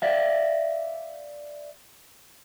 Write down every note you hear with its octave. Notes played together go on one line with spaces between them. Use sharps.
D5 E5 F5